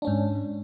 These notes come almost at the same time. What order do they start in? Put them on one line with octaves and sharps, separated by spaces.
D4 C#4 G#2